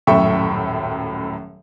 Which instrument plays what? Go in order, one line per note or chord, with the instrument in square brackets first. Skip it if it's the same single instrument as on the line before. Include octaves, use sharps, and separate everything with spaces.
[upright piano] D#1 F#2 A2 E5 G5 C#6